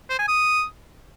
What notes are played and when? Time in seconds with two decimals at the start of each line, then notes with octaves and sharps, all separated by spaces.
0.10 C5
0.19 G#5
0.28 D#6